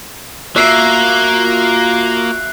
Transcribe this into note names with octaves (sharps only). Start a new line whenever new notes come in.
A#3 F4 F#4 E5 F#6 C7